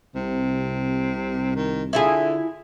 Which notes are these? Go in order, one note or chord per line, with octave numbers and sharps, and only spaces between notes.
C2 C3
D#3
D3 E4 F4 G#4